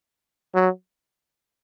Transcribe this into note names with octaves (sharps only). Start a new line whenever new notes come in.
F#3